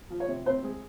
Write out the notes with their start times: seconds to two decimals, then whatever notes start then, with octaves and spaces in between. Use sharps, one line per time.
0.10 F3
0.20 C#5
0.28 C3
0.46 C4 C5
0.64 G#3